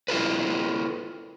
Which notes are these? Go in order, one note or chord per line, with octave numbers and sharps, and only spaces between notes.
E4 F4 A4 B4